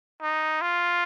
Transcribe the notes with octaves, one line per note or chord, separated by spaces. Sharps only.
D#4
F4